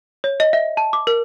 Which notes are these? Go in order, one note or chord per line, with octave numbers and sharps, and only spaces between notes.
C#5
D#5
E5
A5
D6
A#4